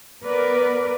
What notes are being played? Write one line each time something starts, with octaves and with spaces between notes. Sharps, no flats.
B3 A#4 B4 D5